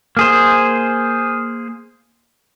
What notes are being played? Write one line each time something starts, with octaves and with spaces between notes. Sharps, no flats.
A#3 G#4 C5